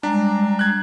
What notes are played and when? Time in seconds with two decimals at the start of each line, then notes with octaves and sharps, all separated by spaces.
0.03 G3 G#3 D4 A#5
0.59 F#6 G#6